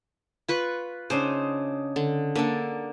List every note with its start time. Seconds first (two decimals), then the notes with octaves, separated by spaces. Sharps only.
0.49 F4 B4 C#6
1.10 C#3 D4 D#4 C5
1.96 D3
2.36 D3 A#3 A4